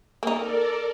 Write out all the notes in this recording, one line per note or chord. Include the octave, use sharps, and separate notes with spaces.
A#3 D#4 A4 A#4 D5